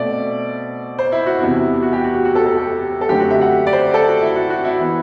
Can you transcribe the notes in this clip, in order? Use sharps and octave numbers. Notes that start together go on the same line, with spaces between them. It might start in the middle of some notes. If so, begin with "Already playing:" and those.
Already playing: B2 A3 C4 D5 E5
C5
E4
F#4
E2 C3 E3 B3 E4
F#4
G4
F#4
F#4
F#4
A4
A4
G4
A4
F#2 D3 A3 C4 G4
F#4
E5
F#5
D5
C5
A4
F#4
E4
F#4
F#4
E4
E3 B3